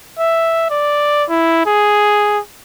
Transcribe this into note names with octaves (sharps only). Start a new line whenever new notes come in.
E5
D5
E4
G#4